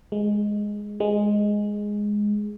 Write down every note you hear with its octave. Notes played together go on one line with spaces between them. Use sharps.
G#3
G#3